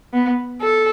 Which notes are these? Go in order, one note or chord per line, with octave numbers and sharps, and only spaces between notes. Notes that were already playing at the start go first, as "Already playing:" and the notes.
B3
A4